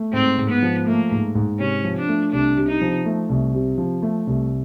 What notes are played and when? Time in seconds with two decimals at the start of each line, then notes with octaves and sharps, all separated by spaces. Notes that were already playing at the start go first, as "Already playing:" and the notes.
Already playing: A3
0.13 G#2 C4
0.38 G#2
0.50 B3
0.63 F3
0.87 A3 A#3
1.11 G#2
1.35 G#2
1.59 C3 C#4
1.84 F3
1.97 D4
2.08 A3
2.32 C2 D4
2.57 C3
2.69 D#4
2.81 F3
3.06 A3
3.30 C2
3.54 C3
3.78 F3
4.02 A3
4.27 C2